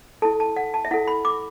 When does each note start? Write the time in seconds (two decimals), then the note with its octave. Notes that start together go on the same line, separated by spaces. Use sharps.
0.22 E4 A4 A5
0.40 A5
0.56 F#5
0.74 A5
0.85 E5
0.91 E4 A4 F#5
1.08 B5
1.25 D6